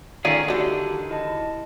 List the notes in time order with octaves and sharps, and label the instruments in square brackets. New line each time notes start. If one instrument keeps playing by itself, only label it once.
[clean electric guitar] D#3 C#4 G#4 [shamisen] A3 F4 D5
[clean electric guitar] D3 D#3 [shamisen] F#3 D4 [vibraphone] F#4 G4 A5
[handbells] E4 D#5 A5 [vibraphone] B5